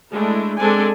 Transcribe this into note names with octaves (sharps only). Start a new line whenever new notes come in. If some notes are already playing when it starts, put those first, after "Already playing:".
G#3 A3 D4 E4
G#3 C4 D4 A4 D5 G#5